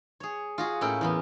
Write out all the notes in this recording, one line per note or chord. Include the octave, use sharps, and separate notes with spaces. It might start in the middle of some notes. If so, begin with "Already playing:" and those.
G#4 C#5
F4 F#4 G#4
A2 A#3 C#4 E4 G5
E2 A#3 B3